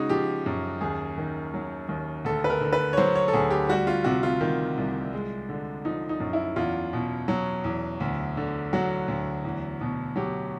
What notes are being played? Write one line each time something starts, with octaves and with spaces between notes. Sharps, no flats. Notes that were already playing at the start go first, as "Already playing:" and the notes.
Already playing: C#3 G#3 D#4 F#4
F3 G4
F#2
D#2 G#4
D#3
F#3
D#2
D2 A4
B4
A#4
D3
B4
C#5
F#3 C5
C#5
A4
D2 G#4
G4
G3 F#4
F4
C3 F#4
F4
D#3
C2
G#3
D3
F3 D#4
D#4
F#2
E4
E2 F4
B2
F#3
E2
D2
D3
F#3 F#4
D2
E2
B2
F#3 G4